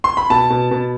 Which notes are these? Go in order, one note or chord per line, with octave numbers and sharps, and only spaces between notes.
C6
B5
B2 A5
B2
B2